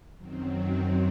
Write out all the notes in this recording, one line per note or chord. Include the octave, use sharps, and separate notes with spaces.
F#2 D#3 F#3 C4